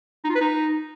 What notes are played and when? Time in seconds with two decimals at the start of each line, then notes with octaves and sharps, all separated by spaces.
0.24 D#4
0.30 F4
0.35 B4
0.41 D#4